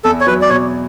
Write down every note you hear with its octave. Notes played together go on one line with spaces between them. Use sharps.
E2 A4
C#5
F#3 B4
D5
B2 C#5